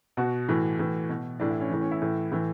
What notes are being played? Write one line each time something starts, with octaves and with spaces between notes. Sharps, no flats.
B2 F#4
A2 E3
A2 E3
B2
A2 E3 D4
E4
C#4
A2 E3
C#4
E4
A2 E3
A2 E3 E4